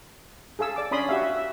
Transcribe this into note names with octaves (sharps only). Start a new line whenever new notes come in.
G#4 A4 F5 E6
D5 D6
C#4 D4 D5 B5 C6 D#6
F#4 G4 E5 F5
E5
E5